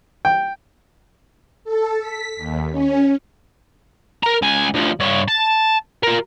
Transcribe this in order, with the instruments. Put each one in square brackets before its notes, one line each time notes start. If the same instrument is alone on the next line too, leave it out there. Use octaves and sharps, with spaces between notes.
[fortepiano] G5
[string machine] A4
B6
D#2
C#4
[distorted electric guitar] A#4 A#5
C#2 G#5
D2 F3
G2 C#5
A5
F4 A#4